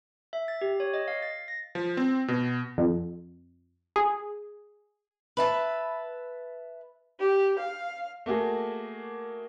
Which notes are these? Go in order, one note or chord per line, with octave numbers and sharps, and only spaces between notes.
E5
A6
G4
C#5
D#5
F5
A6
A#6
F3
C4
B2
F2
G#4
B4 E5 A5
G4
F5
A3 A#3 F#4 G#4